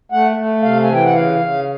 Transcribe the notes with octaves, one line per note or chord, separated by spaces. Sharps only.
A3 F#5
A3
C3 F5
G#5
E3
G5
F#5
C#3 F5
C#3